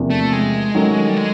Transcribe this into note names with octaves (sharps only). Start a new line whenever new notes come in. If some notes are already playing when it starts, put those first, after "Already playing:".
Already playing: E2 C3 F3 A#3 D4
A3
G#3
D#3 F#3 A3 C#4
G3
G#3